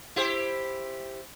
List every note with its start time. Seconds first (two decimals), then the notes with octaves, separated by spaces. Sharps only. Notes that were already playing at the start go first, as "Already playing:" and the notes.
0.16 E4 G4 C5